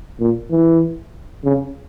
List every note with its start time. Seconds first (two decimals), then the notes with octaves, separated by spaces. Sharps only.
0.20 A#2
0.51 E3
1.44 C#3